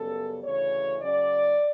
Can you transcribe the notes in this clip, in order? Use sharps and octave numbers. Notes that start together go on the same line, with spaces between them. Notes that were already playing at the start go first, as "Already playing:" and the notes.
Already playing: F#2 C#3 G3 B3 A4
D2 C#3 E3 C#5
C#3 F#3 C#4 D5